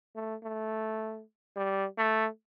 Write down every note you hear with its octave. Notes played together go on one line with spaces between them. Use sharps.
A3
A3
G3
A3